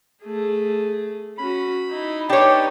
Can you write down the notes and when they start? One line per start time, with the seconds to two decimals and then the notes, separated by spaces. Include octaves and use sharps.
0.23 A3 G#4
1.38 C#4 F#4 B5
1.90 D#4 E4
2.29 D4 D#4 G4 B4 C#5 G5